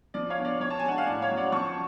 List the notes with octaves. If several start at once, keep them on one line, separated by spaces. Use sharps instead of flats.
F3 D5
C#5 F5
B3 D4
D5
F3 C#5
A5
G#5
G#3 D4 F#5
F5
A2 D5
C#5 F5
F#3 C#4
D5 F#5
F3 A5 C#6